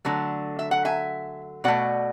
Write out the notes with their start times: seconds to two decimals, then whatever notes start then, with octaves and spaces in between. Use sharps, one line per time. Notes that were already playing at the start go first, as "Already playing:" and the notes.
0.05 D3 F#3 A3
0.59 E5
0.71 F#5
0.85 E5 G#5
1.64 B2 A3 D5 F#5